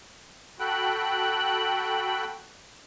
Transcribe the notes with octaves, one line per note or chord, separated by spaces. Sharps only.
F#4 A4 G5 B5 F#6